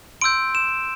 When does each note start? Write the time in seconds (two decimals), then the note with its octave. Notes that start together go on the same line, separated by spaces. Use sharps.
0.21 C6 E6 G6 D7
0.55 E7